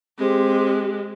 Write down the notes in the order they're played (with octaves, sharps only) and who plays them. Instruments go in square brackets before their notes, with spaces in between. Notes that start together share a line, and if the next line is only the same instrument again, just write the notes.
[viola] G#3 [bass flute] C4 [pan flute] G4